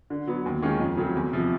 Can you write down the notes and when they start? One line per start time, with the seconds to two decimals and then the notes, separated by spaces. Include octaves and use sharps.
0.10 D3
0.27 F#3 B3
0.46 D#2
0.62 D#3 G#3 C#4 F4
0.80 F2
0.97 C#3 F#3 A3 C4
1.16 E2
1.33 C3 F3